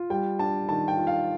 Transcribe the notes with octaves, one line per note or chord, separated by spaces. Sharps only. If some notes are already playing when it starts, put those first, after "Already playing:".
Already playing: F4
G3 G5
D4 A5
D#3 A5
G5
F4
F5